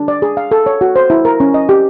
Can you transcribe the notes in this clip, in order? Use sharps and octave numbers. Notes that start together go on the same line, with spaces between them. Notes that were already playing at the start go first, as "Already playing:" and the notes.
Already playing: D4
D5
G#4
F5
A4
C#5
F#4
C5
E4
A#4
C#4
D#5
G4